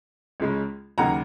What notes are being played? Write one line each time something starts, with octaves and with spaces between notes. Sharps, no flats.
C#2 C#3 G#3 C#4
D#2 C#3 F#3 A#3 D#4 F#5 A#5